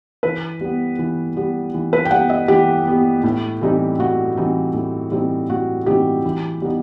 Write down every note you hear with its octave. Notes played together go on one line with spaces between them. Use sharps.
E3 B4
G3 B3
E3
G3 B3
E3
B4
G5
G3 B3 F#5
D#5
E3 G4
G3 B3
A2
E3 G3 C4 D#4
A2 F#4
E3 G3 C4 D#4
A2
E3 G3 C4 D#4
A2 F#4
E3 G3 C4 D#4 G4
E3
G3 B3 D#4